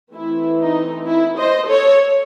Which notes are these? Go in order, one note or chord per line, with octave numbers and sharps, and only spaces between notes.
E3 A3 C4 E4
D#4
E4
C5 D#5
A4 C#5